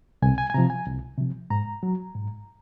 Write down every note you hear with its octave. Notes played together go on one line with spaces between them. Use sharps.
C2 G#5
G#5
G#5
C3 F3 A#5
G#5
C2
C3 F3
G#2 A#5
F#3
G#2